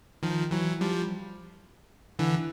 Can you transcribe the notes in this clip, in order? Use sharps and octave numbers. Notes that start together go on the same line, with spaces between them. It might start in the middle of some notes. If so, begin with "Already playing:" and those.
D#3 F3
E3 F#3
F3 G3
D3 E3